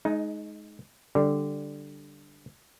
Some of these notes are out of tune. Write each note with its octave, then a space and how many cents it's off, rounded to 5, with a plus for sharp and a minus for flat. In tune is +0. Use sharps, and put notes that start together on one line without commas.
G#3 +30 D#4 +0
D3 +0 G3 +0